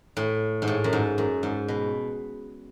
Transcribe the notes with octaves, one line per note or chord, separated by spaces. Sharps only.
A2
G#2
A2
F#2
G#2
F#2
G#2
B2